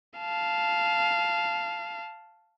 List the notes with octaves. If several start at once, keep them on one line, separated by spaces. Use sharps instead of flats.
F5 A5